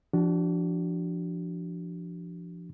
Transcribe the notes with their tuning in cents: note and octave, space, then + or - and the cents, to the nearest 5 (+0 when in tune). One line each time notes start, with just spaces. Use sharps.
F3 -20 D4 +0 F#4 +45